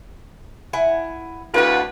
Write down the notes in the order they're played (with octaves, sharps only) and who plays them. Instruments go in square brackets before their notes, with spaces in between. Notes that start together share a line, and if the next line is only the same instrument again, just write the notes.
[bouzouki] E4 F#5 G#5
[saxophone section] D2 A2 B4 [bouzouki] F4 F#5